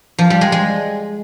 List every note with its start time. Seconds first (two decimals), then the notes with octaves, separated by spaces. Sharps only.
0.18 F3
0.30 G3
0.41 G#3
0.52 G#3